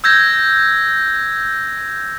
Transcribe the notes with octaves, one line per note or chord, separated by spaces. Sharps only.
E6 G6 G#6 A#6